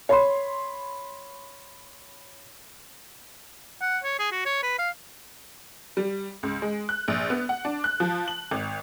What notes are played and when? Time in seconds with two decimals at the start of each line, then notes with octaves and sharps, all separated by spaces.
0.09 C#5 B5 C6
3.81 F#5
4.04 C#5
4.19 G#4
4.31 F#4
4.45 C#5
4.63 B4
4.79 F5
5.97 G3
6.43 C#2
6.62 G#3
6.89 F#6
7.08 A#1
7.30 B3
7.49 F#5
7.65 D4
7.84 F#6
8.00 F3
8.28 F#7
8.51 G#1